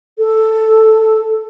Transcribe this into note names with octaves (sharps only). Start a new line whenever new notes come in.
A4